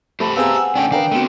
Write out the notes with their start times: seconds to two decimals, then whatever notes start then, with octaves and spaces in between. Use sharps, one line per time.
0.20 A3 G4 C5 A5 B5
0.36 B3 C4 G#4 F5 G#5 A#5 E6
0.55 F#5 G#5
0.75 A3 C#4 D4 G5
0.91 D#3 D4 A#4 B4 F5 G5
1.11 A3 B3 C4 F#4